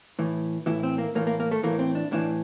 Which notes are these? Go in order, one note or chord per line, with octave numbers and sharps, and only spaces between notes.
A2 E3
A2 E3 E4
C4
A#3
A2 E3 A#3
A#3
A#3
A3
A2 E3 A#3
C4
D4
A2 E3 D4